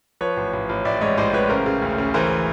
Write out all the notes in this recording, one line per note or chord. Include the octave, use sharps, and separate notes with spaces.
F3 B4 C#5
A1
A1
A1
A1 D5 E5
G#2 C#5 D#5
A1 C5 D5
A1 B4 C#5
C#3 A#4 C5
C#3
D2
C#3
E3 A#4 C5